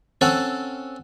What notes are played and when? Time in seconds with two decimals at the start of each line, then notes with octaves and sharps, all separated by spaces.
0.21 C4 C#4 A4 F#5 A5